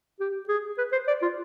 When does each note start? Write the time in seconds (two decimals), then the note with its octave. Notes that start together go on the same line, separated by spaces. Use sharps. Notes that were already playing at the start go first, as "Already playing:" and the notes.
0.20 G4
0.48 G#4
0.78 B4
0.92 C5
1.07 D5
1.22 F4